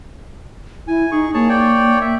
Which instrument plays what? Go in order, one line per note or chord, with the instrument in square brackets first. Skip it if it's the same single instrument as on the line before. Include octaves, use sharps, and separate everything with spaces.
[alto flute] E4 [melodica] G#5
[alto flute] D#4 [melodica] G#4 C#6
[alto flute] A#3 [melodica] G#4 C#5 A5
[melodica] C#5 D5 G5
E5